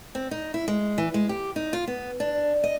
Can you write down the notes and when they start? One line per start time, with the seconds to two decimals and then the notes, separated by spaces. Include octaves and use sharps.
0.15 C4
0.31 D#4
0.54 E4
0.68 G#3
0.98 E3
1.14 G#3
1.29 G4
1.56 D#4
1.73 F4
1.87 B3
2.20 D4
2.64 D#5